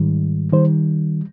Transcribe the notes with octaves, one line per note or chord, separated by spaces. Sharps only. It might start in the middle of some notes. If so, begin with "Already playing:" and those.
Already playing: G#2 D#3 G3
D#3 G3 C5